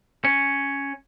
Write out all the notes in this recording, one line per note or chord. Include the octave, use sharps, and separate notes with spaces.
C#4